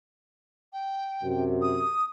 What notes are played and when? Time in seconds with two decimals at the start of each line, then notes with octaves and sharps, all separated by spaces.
0.73 G5
1.22 F#2 C3
1.62 D#6